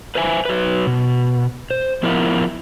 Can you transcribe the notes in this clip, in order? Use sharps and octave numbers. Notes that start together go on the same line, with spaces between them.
B4 C5 E5 G#5
F#3 B4
B2
C5
F3 B3 E4 F4 A#4 E5